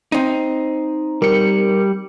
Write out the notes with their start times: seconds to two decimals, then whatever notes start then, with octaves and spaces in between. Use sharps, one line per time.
0.12 C4 D#4
1.22 G3 A#4 C#7